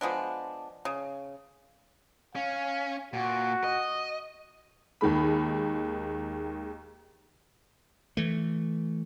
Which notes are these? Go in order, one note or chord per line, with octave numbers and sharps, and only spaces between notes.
F3 G#3 B3 D4
C#3
C#4 F5
A#2 F#4
D#5
D#2 D#3 G#3 B5
E3 A3